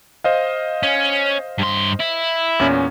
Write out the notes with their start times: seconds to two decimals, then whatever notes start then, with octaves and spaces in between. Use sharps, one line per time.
0.24 C5 D#5 F5
0.83 C#4
1.59 G2 C6
2.00 E4
2.59 E2 A#2 C#4